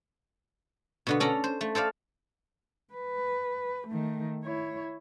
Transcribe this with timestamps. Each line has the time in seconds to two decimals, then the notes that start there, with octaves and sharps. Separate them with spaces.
1.07 B2 D3 B3
1.20 C#4 A4 D5 A#5
1.44 C5
1.61 A3
1.75 A4 C5 D5 F5
2.94 B4
3.88 D#3 A3
4.44 E4 C#5